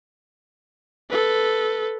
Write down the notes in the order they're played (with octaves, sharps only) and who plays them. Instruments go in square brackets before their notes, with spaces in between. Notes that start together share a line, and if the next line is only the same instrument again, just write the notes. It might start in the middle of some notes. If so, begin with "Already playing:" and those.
[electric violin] A4 B4